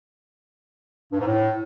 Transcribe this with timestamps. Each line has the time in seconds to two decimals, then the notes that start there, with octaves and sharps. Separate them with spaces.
1.12 G2
1.19 G#2
1.26 A2